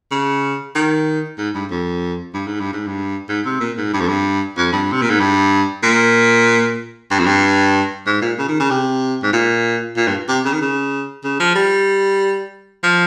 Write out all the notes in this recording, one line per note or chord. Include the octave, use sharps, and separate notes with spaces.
C#3
D#3
G#2
G2
F2
G2
G#2
G2
G#2
G2
G#2
C3
A#2
G#2
G2
F2
G2
F2
G2
C3
A#2
G#2
G2
A#2
G2
F2
G2
G#2
A#2
C#3
D#3
C#3
C3
G#2
A#2
A#2
G2
C3
C#3
D#3
C#3
C#3
F3
G3
F3